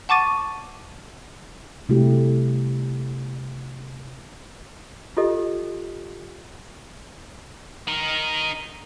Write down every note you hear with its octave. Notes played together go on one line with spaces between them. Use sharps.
F#5 A5 C#6 D6 A6 D#7
C3 G3 A3 E4 F#4 G4
F4 G4 A4 D#5
D#4 A#4